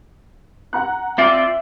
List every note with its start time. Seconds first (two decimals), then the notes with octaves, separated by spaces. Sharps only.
0.73 F#5 A#5 F#6
1.18 C4 F4 D5 E5